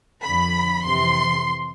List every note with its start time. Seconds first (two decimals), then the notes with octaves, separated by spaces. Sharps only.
0.23 F2 D3 F3 B5
0.84 F2 C3 E3 C6